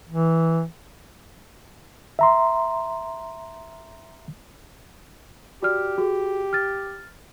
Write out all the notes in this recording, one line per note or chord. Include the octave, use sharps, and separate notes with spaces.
E3
E5 A#5 C6
F#4 G4 D5 F6
F#4 G#4
F6 A6